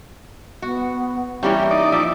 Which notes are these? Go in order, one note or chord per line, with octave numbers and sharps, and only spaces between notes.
B3 F#4
E3 G3 A#3 C#4 G4 E5
D#4 D5
F3 E5